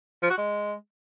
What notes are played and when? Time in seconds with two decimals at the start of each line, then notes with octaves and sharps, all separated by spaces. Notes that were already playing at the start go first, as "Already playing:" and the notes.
0.23 F3
0.30 F#4
0.38 G#3